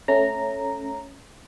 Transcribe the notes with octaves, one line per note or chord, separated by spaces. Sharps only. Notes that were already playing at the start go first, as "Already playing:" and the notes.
A3 C#4 A#5